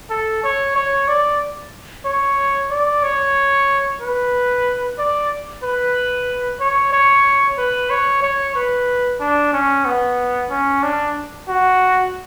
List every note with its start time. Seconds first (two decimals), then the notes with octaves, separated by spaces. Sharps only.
0.10 A4
0.43 C#5
0.76 C#5
1.08 D5
2.05 C#5
2.71 D5
3.03 C#5
4.01 B4
4.98 D5
5.63 B4
6.60 C#5
6.93 C#5
7.58 B4
7.90 C#5
8.23 C#5
8.56 B4
9.20 D4
9.53 C#4
9.85 B3
10.50 C#4
10.83 D4
11.48 F#4